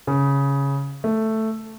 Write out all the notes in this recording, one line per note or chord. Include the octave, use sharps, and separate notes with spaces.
C#3
A3